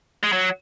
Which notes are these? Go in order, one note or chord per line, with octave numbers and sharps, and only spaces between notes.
G#3
F#3